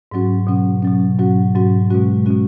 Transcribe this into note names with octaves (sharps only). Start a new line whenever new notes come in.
G#2 F#3 C#4 F#4
B2 F#3 C#4
B2 F#3 C#4
G#2 F#3 C#4 F#4
G#2 F#3 C#4 F#4
B2 G#3 C#4 F#4
B2 G#3 C#4 F#4